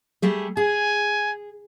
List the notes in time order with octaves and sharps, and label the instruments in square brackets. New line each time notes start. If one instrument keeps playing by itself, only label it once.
[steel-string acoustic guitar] G3 A3 G#4
[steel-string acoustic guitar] G#4 [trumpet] G#5